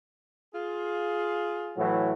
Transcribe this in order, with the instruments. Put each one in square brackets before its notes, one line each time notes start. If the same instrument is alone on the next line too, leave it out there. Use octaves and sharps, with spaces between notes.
[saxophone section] F4 G#4
[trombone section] A2 E3 F#3